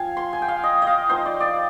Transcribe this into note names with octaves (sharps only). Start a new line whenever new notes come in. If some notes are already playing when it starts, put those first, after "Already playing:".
Already playing: F3 C4 F5 G#5
C6
G#5
G5
F5
D#5
D#5 F5
F3 C4 D#4 C5
D5
D5